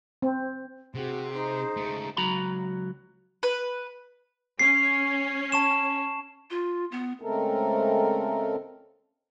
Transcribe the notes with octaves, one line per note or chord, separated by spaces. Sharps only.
C4
C3 C4 F#4 G#4
D#4 C5
C#2 A3
C#2 F#3 F#4 A#5 B5
B4
C#4 C7
A5 C#6 E7
F4
B3
C#3 G#3 A3 C4 A4 A#4